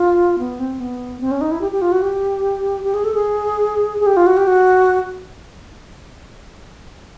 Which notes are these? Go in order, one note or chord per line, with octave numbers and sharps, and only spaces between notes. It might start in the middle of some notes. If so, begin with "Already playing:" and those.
Already playing: F4
B3
C4
B3
C4
C#4
D#4
E4
G4
G4
F4
F#4
G4
G4
G#4
A4
G#4
G#4
G4
F4
F#4
G4
F#4